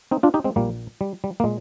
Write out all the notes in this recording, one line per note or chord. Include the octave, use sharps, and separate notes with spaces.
C4 D#4
D4 F4
D#4 G4
G#3 C4
A#1 A#2 G3 A#3
G3
G3
A#3
A#2 G#3